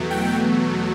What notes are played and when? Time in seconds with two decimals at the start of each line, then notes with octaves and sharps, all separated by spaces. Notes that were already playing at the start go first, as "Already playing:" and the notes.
Already playing: E2 B2 F#3 A3
0.11 G5